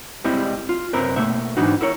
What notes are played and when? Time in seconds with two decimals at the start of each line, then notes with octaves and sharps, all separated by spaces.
0.24 G3 G#3 C4 E4 D#5
0.69 F4
0.93 C2 F#2 C4 A#4 B4
1.16 B2 A3 A#3 E5
1.57 G#2 E3 D4 D#4 F#4
1.81 E4 A#4 C#5